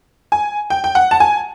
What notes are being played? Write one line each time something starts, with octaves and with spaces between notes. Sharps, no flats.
G#5
G5
G5
F#5
A5
G#5